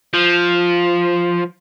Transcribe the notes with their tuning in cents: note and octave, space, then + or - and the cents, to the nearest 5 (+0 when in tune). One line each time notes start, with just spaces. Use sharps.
F3 +0